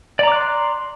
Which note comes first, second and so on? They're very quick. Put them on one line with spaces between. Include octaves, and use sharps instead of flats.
D5 A#5 D6 F#6 C6